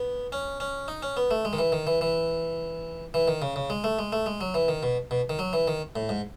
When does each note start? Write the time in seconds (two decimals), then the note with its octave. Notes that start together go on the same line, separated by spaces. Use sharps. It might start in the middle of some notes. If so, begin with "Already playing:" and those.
Already playing: B3
0.32 C#4
0.60 C#4
0.88 D#4
1.03 C#4
1.17 B3
1.31 A3
1.45 G#3
1.53 D#3
1.59 E3
1.72 D#3
1.87 E3
2.01 E3
3.14 E3
3.28 D#3
3.42 C#3
3.56 C#3
3.70 G#3
3.84 A3
3.99 G#3
4.13 A3
4.26 G#3
4.41 F#3
4.54 E3
4.68 D#3
4.83 B2
5.11 B2
5.29 D#3
5.39 F#3
5.53 E3
5.68 D#3
5.96 A2
6.09 G#2